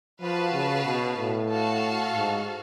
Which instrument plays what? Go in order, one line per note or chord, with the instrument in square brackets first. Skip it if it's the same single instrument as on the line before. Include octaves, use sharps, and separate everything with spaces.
[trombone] F3 [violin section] F#4 B4 F5 A5
[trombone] C#3
B2
A2
[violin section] F#4 A4 F5 A5
[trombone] G#2